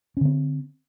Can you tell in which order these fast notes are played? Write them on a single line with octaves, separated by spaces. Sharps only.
C#4 D3 C4